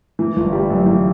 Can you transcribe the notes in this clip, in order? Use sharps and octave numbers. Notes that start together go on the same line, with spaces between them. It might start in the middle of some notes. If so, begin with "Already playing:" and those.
E3
G1
G3
F#2
E3